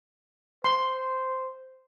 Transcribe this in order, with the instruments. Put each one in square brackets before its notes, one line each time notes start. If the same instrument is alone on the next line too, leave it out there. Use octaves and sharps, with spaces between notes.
[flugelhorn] C5 [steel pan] C6